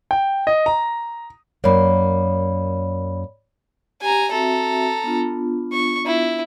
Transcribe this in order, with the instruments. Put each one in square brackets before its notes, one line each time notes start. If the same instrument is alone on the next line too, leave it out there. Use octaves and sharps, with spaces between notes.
[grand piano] G5
D#5
A#5
[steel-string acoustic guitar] F#2 A#3 [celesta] C#5 D5 B5
[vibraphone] G4 [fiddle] G#5 A#5
[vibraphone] C4 F#4 E5 [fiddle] A4 A#5
[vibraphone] B3 D4 F4
[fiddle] C#6
E4